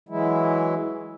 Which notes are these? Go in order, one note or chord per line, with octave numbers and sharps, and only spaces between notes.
E3 F#3 G#3 E4